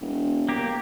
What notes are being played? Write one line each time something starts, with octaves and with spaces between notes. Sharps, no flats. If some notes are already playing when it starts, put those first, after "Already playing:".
E1
A#3 G4